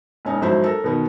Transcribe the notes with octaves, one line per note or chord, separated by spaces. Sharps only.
E1 C#4 D#4
G#1 F2 F#3 E4 C5
A4 A#4
B2 D#3 B3